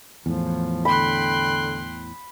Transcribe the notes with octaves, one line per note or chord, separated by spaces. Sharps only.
E2 A2 F3
D3 G5 B5 C6 F#6